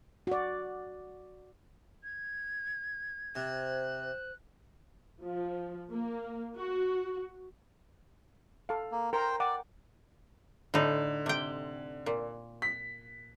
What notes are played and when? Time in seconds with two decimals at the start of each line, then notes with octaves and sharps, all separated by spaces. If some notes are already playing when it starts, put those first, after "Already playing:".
0.27 F#4 D5
2.04 G#6
3.35 C3 C5 F#6
5.23 F3
5.92 A#3
6.56 F#4
8.69 A4 F5
8.92 A#3
9.13 A#4 C5 G5 A#5
9.40 D5 F#5 G5 D6
10.74 A2 D3 D#4
11.26 C3 G5
12.06 A#2
12.62 B6